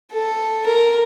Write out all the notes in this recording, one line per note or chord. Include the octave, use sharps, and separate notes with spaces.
A4
A#4